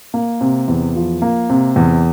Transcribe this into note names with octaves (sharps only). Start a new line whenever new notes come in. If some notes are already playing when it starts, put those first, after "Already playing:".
A#3
C3
E2
F3
A#3
C3
E2